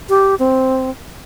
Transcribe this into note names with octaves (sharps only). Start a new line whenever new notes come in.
G4
C4